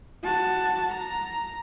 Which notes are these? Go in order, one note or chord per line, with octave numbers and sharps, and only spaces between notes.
F#4 A5
A#5